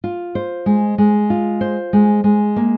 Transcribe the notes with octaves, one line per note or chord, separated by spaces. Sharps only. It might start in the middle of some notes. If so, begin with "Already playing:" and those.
F4
C5
G#3
G#3
F4
C5
G#3
G#3
A#3